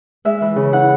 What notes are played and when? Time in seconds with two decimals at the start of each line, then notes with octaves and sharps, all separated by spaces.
0.25 G#3 E5
0.41 E3
0.56 C#3
0.72 E4 F#5